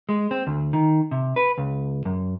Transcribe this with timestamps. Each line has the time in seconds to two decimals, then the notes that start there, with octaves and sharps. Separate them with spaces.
0.09 G#3
0.31 C4
0.47 D2
0.73 D#3
1.11 C3
1.36 B4
1.58 C#2
2.05 F#2